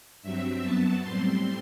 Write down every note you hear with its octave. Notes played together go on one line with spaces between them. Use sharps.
G2 F#3 C4 E5
F#2 F#3 B3 A5
A2 G3 C4 C6